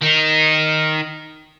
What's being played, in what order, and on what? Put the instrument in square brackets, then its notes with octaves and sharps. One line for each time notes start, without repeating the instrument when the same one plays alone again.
[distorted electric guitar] D#3 D#4